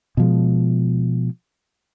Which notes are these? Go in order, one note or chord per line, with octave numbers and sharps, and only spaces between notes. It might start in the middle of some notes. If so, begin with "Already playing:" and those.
B2 F3 G#3